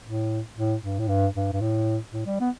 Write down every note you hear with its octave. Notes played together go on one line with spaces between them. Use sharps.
A2
A2
G2
A2
G2
G2
G2
A2
A2
G3
B3